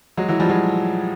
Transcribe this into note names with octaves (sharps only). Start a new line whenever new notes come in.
F#3 G#3
E3 F#3
F3 G3
F#3 G#3